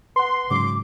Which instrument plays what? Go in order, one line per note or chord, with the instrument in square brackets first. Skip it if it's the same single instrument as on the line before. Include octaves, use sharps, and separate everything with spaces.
[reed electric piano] B4 F#5 [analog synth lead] C6
[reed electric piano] G#2 C#3 F#3 [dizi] D6